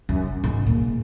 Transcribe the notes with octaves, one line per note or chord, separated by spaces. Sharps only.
F#2
G#2
A#2